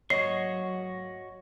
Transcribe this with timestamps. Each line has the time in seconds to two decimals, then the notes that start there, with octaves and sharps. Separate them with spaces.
0.10 G#2 F#3 A#3 F#4 C#5 D#5 C#6 C7